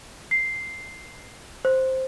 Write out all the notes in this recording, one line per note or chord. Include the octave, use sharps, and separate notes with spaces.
C7
C5